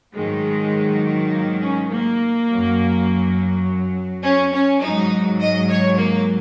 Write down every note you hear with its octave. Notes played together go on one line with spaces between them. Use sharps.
G#2 D#3 F#3 G#3
A#3
C#4
A#3
F#2 F#3
C#4
C#4
G#2 F#3 D#4
D#5
C#5
A#3